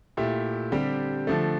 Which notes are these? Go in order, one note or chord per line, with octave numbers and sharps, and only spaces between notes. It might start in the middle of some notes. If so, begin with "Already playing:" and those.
A#2 A3 E4 G4
D3 G3 C4 G4
D3 F3 A3